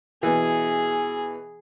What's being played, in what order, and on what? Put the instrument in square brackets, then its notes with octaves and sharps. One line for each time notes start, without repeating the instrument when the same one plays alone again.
[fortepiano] B2 E3 [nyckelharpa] G#4